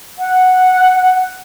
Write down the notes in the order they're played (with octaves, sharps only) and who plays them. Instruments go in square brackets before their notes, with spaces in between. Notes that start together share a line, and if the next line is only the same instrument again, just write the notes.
[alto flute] F#5